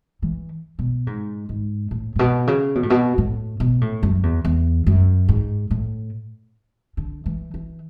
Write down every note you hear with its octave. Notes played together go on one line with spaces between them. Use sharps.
E3
B2
G#2
G#2
A2
A2
B2
C#3
B2
A2
B2
A2
B2
A2
F#2
E2
E2
F#2
G#2
A2
D3
E3
E3